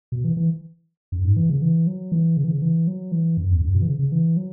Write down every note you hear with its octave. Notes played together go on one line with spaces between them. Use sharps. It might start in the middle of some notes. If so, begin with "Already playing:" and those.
B2
E3
E3
F#2
G#2
E3
C#3
E3
F#3
E3
C#3
E3
C#3
E3
F#3
E3
F#2
E2
F#2
B2
E3
C#3
C#3
E3
F#3